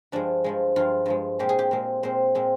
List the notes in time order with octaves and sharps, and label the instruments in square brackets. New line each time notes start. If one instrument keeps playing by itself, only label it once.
[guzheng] G2 F3 G#3 D4
G2 F3 G#3
G2 F3 G#3 F4
G2 F3 G#3
A#2 G#3 C4 G4
G#4
G4
A#2 G#3 C4
A#2 G#3 C4 C5
A#2 G#3 C4